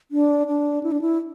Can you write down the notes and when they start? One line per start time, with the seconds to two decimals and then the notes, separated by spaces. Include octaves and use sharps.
0.11 D4
0.47 D4
0.83 E4
0.92 D4
1.01 E4